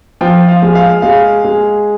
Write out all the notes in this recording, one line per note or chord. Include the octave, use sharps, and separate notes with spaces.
F3 G5
F5
G#3
F5
G#3 F5
G#3